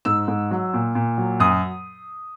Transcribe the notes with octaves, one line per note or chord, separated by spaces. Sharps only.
G#2 E6
G#2
F#3
A#2
A#2
F#3
F#2 D#6